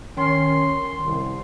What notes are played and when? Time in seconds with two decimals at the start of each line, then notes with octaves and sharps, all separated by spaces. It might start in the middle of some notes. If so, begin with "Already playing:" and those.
0.17 D#3 C#4 C6
1.05 C2